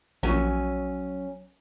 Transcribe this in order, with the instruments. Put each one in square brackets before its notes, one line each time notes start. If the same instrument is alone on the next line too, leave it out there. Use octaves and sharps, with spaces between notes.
[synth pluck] A#1 [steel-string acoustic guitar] F#3 C#4 G#5